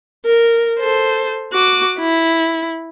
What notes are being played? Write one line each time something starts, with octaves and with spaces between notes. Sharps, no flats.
A#4
A4 C5
F#4 D6
E4